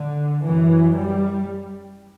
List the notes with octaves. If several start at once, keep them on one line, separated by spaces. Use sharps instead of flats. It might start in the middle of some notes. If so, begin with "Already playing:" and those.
Already playing: D3
F#2 E3
G3